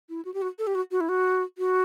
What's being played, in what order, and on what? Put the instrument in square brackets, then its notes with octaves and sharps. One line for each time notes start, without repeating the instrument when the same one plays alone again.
[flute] E4
F#4
G4
F#4
A4
G4
F#4
F#4
E4
F#4
F#4